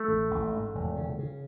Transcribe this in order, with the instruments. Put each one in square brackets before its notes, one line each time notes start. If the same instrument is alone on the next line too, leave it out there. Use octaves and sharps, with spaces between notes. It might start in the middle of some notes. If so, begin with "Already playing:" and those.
Already playing: [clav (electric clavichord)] A3
[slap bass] A1
A1
G#2
E1
C#3
C#3